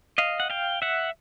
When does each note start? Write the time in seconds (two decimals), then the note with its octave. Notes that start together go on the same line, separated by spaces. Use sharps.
0.18 D#5 F5
0.40 F#5
0.50 F5 G5
0.82 E5 F#5